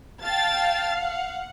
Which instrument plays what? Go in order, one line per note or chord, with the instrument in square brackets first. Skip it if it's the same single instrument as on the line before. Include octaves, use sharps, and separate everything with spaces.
[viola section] F5 [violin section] G5 A5 A6
[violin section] F#5